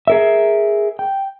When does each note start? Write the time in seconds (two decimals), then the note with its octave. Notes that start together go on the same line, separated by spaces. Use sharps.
0.07 G#4 A#4 E5
0.99 G5